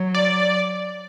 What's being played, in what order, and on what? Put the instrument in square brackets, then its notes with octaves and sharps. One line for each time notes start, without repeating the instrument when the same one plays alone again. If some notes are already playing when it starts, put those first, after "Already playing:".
Already playing: [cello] F#3
[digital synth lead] D5